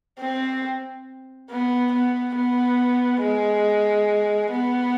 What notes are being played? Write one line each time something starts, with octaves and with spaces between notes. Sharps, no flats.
C4
B3
B3
B3
G#3
B3